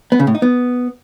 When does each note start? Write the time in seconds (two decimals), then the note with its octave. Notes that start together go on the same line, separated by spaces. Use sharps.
0.12 B3
0.20 C#3
0.27 A2
0.35 D#4
0.42 B3